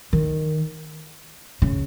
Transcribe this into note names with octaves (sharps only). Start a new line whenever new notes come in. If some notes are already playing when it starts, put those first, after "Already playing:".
D#3
C#3